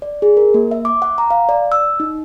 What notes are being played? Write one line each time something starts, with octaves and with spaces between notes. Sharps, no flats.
D5
G#4
A#4
A#3
E5
D6
F#5
A#5
F5
D5
E6
D#4